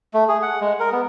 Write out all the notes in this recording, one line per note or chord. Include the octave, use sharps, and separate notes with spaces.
A3
G#4
F#5
G#3
A#4
B3